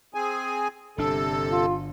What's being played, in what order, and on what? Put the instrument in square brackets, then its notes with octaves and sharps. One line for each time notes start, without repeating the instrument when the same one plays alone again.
[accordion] C4 G#4 G#5
[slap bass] G1 D4 [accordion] C3 A4
[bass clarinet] F4